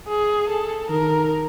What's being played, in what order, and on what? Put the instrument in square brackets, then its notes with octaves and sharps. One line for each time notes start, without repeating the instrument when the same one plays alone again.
[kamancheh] G#4
A4
[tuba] D#3 [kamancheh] A#4